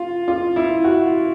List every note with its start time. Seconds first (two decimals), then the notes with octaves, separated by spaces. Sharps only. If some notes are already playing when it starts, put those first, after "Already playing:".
Already playing: F4
0.28 F4
0.56 E4
0.84 F#4